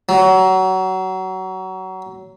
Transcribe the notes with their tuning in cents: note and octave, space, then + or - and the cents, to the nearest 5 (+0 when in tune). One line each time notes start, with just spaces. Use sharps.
F#3 +25